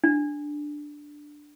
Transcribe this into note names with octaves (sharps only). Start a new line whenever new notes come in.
D4